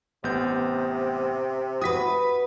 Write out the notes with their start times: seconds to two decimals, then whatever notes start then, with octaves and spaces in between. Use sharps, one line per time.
0.24 A1 C3 B3 G6
1.82 F#4 B4 D#6 B6